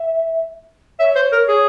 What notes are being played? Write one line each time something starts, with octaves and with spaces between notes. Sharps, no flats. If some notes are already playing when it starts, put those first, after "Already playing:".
Already playing: E5
C#5 E5
C5
A#4
G#4